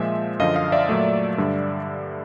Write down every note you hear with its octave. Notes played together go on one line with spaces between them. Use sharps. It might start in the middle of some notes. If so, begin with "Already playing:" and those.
Already playing: A#2 F3 G#3 E5
F#2 D3 F3 D#5 F5
D#5 F5
D5 E5
A#2 F#3 A3
G2 D3 G3